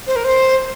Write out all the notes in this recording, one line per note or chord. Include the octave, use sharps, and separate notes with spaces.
C5
A#4
C5